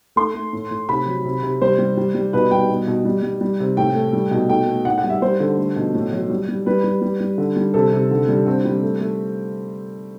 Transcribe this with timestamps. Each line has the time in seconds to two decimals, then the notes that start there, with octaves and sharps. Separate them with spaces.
0.16 A3 C6
0.34 A3
0.53 A2
0.71 A2
0.89 C3 B5
1.06 F#3
1.25 C3
1.43 C3
1.62 G3 C5
1.79 G3
1.97 G3
2.15 G3
2.33 B2 B4
2.51 G3 G5
2.69 B2
2.87 B2
3.05 G3
3.23 G3
3.41 G3
3.60 C3
3.77 A2 G5
3.95 A3
4.13 G3
4.31 B2
4.49 A3 G5
4.67 A3
4.85 A2 F#5
4.98 F#5
5.04 G3
5.10 E5
5.22 G3 C5
5.40 D3
5.57 A3
5.76 B2
5.94 A2
6.13 F#3
6.30 G3
6.49 G3
6.66 G3 B4
6.84 G3
7.02 G3
7.21 G3
7.38 D3
7.56 G3
7.74 C3 A4
7.93 C3
8.11 D3
8.28 G3
8.46 D3 C4
8.65 G3
8.83 A3
9.00 A3